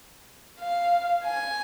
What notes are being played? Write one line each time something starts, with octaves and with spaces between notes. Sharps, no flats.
F5
G#5